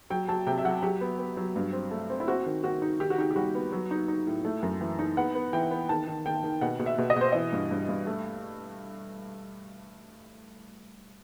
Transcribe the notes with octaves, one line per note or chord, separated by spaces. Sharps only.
F#3 G5
F#3 A5
C3 G5
E5
F#3 F#5
F#3 G4
B3
B3
F#3
G2
C4
A3
C4
E4
C4 F#4
D#3
D#3 F#4
D#4
D#3 G4
F#4
D#4 G4
G4
G3 F#4
B3
F#3
D#4
D#4
A2
A3
F#2
E3
D#4
B3 F#5
B3
E3 G5
B3
D#3 A5
D#3
D#3 G5
D#3
B2 F#5
B2
E5
B2
D#5
B2 C5
E3 D#5
G2
G2
G2
A3